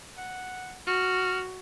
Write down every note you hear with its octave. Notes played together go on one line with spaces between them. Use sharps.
F#5
F#4 F6